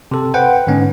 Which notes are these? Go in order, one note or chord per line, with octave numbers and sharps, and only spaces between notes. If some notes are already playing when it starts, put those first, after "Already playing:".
C3 A4
B4 C5 F#5 G5
G#2 D3 B3 C#4